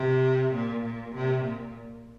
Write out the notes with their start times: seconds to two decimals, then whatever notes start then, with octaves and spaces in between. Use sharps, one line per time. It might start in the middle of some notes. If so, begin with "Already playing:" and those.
Already playing: C3
0.54 A#2
0.85 A#2
1.15 C3
1.44 A#2